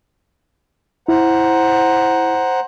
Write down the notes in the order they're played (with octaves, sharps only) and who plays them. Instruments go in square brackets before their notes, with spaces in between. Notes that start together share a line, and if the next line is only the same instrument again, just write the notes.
[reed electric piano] E4 [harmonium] C5 F#5 A#5